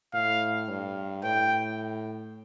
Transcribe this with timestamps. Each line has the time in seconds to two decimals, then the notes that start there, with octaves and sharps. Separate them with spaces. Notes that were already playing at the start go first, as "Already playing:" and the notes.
0.14 A2 F5
0.69 G2
1.23 A2 G5